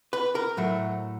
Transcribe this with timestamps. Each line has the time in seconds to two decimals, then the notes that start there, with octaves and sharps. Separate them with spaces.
0.13 B4
0.35 A#4
0.57 A2 F#3 A3